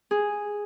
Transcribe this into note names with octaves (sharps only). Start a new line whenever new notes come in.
G#4